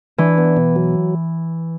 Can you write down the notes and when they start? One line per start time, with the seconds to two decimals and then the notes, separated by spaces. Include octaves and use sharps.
0.18 E3 D4
0.38 B3
0.57 B2
0.76 F#3